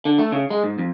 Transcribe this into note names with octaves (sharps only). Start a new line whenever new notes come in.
D3
A3
C#3
G#3
G#2
F2